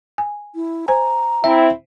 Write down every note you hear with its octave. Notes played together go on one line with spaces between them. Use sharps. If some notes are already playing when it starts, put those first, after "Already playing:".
G#5
E4
C5 G#5 A#5
C4 E4 E5